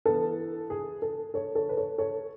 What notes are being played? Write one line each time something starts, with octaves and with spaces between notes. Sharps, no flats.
E3 B3 E4 A4
G#4
A4
A4 C#5
A4 C#5
B4
A4 C#5
A4 C#5